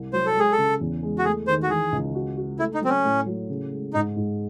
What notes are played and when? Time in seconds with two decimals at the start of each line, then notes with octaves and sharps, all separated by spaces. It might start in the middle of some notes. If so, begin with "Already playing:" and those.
Already playing: C2
0.13 F#3 C5
0.26 A4
0.36 G#3 G#4
0.52 A4
0.58 C#3
0.81 E2
1.03 G#3
1.18 F#4
1.25 A3 G#4
1.47 D#3 C5
1.63 F#4
1.69 E3 G#4
1.92 C#2
2.15 F#4
2.37 F#4
2.59 A3 E4
2.74 D#4
2.81 F#3 C4
2.89 C#4
3.04 A2
3.26 F#3
3.49 C#3
3.72 G#3
3.93 G#2 D#4
4.16 G#2